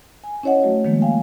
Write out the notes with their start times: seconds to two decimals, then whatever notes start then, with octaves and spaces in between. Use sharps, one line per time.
0.24 G#5
0.43 C#4 E4 C#5 D#5 F#5
0.63 F#3 A3 F#4
0.85 D#3 F3 G#3 A#3
1.02 F5 G5 G#5